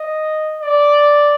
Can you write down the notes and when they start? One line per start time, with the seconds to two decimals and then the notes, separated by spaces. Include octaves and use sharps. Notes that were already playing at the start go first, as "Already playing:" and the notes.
Already playing: D#5
0.62 D5